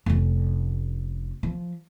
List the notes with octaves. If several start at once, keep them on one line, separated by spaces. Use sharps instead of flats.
F1 C#4
F3